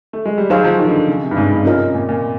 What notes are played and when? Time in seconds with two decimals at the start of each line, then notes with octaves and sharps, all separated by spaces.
0.13 A3
0.25 G#3
0.38 G3
0.50 F#3 D#4 G#4 C5 F5
0.64 F3
0.79 D#3
0.88 D3
1.08 C#3
1.22 C3
1.31 G2
1.37 G#2
1.51 G2
1.65 C3 C#4 F4 A#4 D#5
1.95 A#2
2.09 A#2